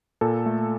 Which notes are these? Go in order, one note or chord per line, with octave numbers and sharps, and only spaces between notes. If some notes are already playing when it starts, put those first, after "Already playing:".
A#2 A4
A3